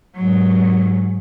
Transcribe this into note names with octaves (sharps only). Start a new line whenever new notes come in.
G#2 F#3